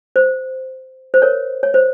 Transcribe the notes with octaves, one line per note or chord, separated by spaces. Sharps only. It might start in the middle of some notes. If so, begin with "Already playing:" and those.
C5
C5
A#4 C#5
C#5
C5